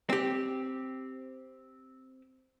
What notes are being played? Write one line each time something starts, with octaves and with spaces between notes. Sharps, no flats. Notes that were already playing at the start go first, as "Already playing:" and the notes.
C4 G4